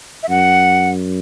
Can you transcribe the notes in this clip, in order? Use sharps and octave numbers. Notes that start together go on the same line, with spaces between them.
E5
F#2 F#5